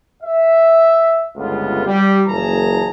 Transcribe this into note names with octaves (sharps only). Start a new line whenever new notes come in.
E5
G1 C#2 A3 B3 F4
G3
F#1 A#2 E3 G#4 A5 A#5